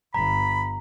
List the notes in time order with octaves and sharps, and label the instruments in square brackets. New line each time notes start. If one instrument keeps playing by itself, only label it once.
[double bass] G1 [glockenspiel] A#5 [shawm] B5